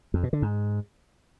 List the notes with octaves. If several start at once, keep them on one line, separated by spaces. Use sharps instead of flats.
F2
B2
D3
G#2